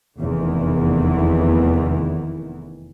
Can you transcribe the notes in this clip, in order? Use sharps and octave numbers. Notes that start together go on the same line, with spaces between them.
F1 E2 D#3 E3